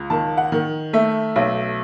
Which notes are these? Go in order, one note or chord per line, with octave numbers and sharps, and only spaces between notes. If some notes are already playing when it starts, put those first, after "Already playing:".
Already playing: C#2
D#3 A5
F#5
D#3
A3 E5
B1